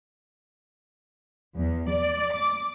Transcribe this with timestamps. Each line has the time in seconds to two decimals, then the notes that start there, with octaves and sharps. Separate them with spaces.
1.56 E2
1.90 D5
2.33 D6